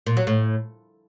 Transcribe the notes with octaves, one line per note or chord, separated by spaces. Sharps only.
A#2
F#3
A2